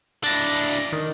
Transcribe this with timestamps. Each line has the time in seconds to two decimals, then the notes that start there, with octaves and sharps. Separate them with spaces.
0.23 D4 E4 A6 A#6
0.92 D#3